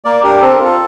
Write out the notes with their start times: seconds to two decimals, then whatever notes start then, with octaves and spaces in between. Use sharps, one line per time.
0.05 A#3 A#4 D5
0.24 D4 G4 A#4
0.41 C4 A4
0.53 A#4
0.60 F4 A4